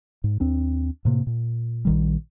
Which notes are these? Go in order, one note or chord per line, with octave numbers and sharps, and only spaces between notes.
G#2
D#2 C4 D4
A2 C3 A#3
A#2
A#1 D#3 G3